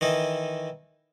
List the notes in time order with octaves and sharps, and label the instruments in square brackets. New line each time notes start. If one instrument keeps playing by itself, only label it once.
[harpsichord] D#3 E3 D#4